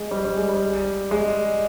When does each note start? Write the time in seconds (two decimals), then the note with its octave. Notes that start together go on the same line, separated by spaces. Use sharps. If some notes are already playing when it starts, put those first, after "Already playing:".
Already playing: G#3
0.11 G3
0.25 G3
0.37 G#3
0.49 G3
1.11 G#3